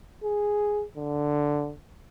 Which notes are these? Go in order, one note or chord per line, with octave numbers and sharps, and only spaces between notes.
G#4
D3